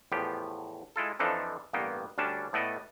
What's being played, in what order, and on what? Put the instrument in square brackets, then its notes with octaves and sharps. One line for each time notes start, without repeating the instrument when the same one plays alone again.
[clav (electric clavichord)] E2 A2 F3 B3 G4
G#3 E4 F4 A4
F2 E3 F3 D4 D#4 A4
A1 G2 A#3 B3 G5
D2 G3 C#4 D4 A5
A2 A3 B3 A4 D5 D#5